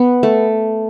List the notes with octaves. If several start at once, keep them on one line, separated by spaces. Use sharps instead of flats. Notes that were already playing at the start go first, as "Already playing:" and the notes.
Already playing: B3
A3